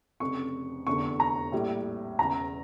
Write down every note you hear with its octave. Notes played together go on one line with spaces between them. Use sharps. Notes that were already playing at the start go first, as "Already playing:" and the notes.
F1 F2 C#3 C#6
F1 E2 D3 C#6
A#5
A#1 A2 G3
E1 E2 C#3 A#5